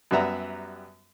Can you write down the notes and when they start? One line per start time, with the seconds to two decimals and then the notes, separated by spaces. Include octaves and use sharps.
0.11 F#2 G3 B3 E5 A#5